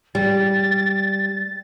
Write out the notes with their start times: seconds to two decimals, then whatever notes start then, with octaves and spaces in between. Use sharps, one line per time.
0.15 G3 A6